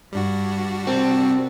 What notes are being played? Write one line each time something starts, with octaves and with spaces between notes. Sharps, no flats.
G2 G3 D4 F#4
C3 C4 A#4 C5 A5